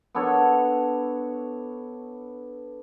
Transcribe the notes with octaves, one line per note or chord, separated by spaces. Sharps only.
B3 D4 A4 C#5